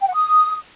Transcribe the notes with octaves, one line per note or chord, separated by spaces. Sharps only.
G5
F#5
D#6